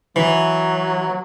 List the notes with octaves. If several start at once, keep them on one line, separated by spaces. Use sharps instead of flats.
E3 F#3